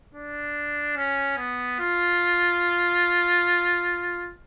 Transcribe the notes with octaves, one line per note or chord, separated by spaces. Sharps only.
D4
C#4
B3
F4